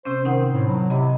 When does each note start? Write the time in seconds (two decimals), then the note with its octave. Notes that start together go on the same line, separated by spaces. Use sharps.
0.05 C3 C4 C#4 C5
0.25 D#3 D#4 F#5
0.51 A2
0.68 F#3
0.90 C3 D#5 B5